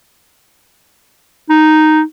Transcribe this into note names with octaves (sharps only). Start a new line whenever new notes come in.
D#4